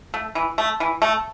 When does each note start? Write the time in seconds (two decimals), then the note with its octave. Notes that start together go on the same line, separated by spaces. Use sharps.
0.14 A3
0.35 E3
0.58 A3
0.80 E3
1.02 A3